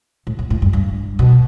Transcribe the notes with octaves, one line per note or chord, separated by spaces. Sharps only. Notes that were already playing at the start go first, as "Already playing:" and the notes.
A2
A2
A2
G2
G2
B2